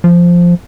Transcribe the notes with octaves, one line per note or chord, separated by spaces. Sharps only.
F3